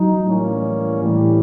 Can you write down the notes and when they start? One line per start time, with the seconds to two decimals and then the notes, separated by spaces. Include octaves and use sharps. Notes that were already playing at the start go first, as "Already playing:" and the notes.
Already playing: F#3 D#4
0.25 A2 E3 G3 A#3 C#4
1.02 A2 E3 G3